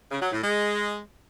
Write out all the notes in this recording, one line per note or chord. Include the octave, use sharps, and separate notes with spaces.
C#3
F#3
A2
G#3